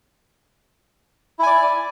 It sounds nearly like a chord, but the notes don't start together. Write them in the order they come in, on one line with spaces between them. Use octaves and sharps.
E4 G#5 D5